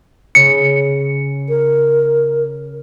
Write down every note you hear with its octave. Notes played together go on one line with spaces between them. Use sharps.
C#3 C#7
A#4